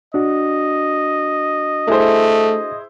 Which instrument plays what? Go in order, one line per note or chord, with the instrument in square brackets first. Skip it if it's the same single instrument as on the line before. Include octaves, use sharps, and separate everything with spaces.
[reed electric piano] D4 F#4 [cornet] D#5
[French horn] A3 [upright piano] E4 G#4 C5